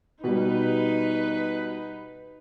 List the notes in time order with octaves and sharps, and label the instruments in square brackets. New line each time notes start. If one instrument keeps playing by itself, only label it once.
[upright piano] B2 G3 [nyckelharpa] D#4 [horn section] B4